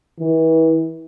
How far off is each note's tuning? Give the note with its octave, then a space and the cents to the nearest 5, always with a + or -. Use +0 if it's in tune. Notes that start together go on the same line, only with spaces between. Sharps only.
E3 -35